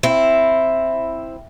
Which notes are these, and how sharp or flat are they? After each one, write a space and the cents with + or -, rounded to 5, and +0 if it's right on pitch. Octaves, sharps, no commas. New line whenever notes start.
C4 +0 E4 +0